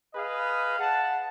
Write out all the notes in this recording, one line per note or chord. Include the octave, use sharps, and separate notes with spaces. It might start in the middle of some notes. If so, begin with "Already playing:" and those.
G#4 B4 D#5 F5
F#5 A5